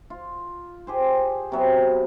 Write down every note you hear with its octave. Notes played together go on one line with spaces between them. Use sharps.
F4
G4 G#4 C5
C3 F#3 B3